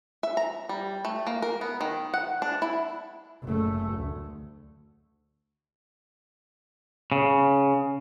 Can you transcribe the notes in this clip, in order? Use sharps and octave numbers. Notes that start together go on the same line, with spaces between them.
E5
A#5
G3
A3
A#3
A#4
B3
D#3
F#5
D4
E4
F#1 A3
D2
C#3